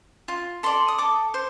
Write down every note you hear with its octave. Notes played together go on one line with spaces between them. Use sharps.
F4
A4 D5 C6
D#6
A4 D6
C5